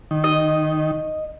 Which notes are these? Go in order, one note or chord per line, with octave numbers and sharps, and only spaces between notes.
D#3
D#5